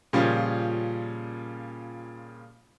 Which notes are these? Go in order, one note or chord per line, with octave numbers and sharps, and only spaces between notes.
A#2 C#3 F3 G3 C#4 F4